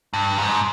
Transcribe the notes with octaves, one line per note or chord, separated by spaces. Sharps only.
G2
G#2